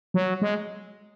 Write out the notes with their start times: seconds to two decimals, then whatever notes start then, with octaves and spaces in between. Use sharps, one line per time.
0.14 F#3
0.42 G#3